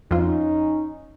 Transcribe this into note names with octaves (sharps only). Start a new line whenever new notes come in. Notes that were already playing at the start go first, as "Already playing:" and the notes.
F2 C#4 D#4 F4